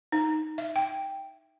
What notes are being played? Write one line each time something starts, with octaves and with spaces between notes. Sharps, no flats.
D#4
E5
G5